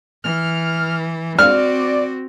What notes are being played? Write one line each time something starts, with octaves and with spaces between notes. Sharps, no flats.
E3 F6
C4 F#4 D5 F6